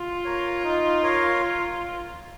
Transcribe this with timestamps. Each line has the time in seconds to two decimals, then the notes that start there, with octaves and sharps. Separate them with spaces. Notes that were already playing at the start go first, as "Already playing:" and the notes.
Already playing: F4
0.24 A#4 C#5 F5
0.63 D#4
1.02 A#4 C#5 F5